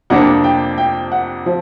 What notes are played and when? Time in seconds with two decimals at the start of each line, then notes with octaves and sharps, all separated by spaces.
0.10 F2 C3 F3 A#3 D4 F#5
0.44 G5
0.78 G5
1.12 F#5
1.46 F3